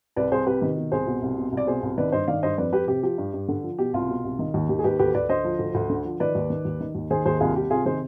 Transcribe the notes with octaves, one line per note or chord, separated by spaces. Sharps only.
C2 B4 D5
C2 G#4 C5
C3 G4 B4
D#3
B2
C2 G#4 C5
B2
C2
B2
C2
D5
B2 G#4 C5
C2
D#3 B4 D5
G2 C5 D#5
D#3 D5 F5
G2 C5 D#5
F2 B4 D5
F2 G4 B4
C3 G4
F3 G4
G2
G2
D3
F3
B2 G4
C2 F4
B2
C2
D#3
D#2
D#3 G4
G#4
D#2 G4 B4
D2 G4 B4
D2 B4 D5
D3 C5 D#5
F3
D2
D2
D3
F3
D#3 B4 D5
D#2
D#3
D#2
D#3
D#2
D#3 G#4 C5
D#2 G#4 C5
C2 F4 G#4
C2 G4
C3 F4 G#4
D#3 G#4 C5